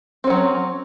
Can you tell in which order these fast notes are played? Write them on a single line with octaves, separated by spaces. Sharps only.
C4 C#4 F#3